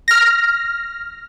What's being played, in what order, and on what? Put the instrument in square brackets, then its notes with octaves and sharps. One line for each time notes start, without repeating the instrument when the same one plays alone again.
[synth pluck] F6 A#6